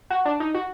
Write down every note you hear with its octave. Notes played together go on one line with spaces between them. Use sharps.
F#4
D4
D#4
F#4